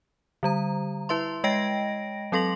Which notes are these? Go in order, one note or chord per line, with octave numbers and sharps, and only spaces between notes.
D3 G3 A#5
E4 B4 E5 C6
G#3 D#5 G5 A#6 D7
F#3 C4 A4 C6 A#6 F#7